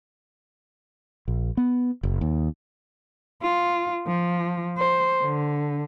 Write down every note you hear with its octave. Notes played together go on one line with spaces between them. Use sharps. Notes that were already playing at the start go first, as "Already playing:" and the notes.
A#1
B3
F#1
D#2
F4
F3
C5
D3